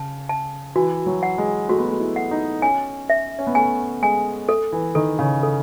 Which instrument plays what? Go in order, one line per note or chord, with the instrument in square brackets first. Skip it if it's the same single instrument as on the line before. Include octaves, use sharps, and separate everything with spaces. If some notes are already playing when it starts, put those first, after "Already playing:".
Already playing: [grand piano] C#3 [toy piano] A5
[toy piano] A5
[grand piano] E3 [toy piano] F#4
[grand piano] F#3
[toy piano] F#5
[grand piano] G#3
[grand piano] A3 [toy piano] F#4
[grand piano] B3
A3
E4
[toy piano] F#5
[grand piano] D#4
[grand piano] C#4 [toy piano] G#5
[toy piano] E5
[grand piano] C#4
B3
[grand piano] A3 [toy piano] G#5
[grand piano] G#3 [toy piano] G#5
[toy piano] A4
[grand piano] E3
[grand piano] D#3 [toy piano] A4
[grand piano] C#3
[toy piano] A4